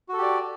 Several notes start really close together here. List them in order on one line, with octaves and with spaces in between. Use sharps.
F#4 A4 G4 D5